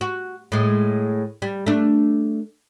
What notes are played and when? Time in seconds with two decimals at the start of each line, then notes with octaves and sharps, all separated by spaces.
0.01 F#4
0.52 A2 G#3
1.42 G3
1.66 A3 D4